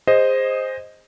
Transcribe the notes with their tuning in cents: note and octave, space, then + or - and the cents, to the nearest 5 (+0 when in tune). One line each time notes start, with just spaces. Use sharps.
G#4 -25 C5 +0 D#5 +0